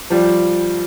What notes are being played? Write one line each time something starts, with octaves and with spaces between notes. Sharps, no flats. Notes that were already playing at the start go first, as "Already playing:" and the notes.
F3 G3